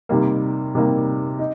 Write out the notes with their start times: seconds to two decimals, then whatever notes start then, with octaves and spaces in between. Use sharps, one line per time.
0.09 C3 D#3 G3 A#3
0.75 C3 D#3 G3 A#3
1.39 D#4